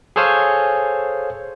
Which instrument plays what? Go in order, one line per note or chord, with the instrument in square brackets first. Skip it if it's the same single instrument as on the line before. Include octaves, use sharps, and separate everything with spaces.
[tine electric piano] G#4 A4 C5 C#5 F5 G#5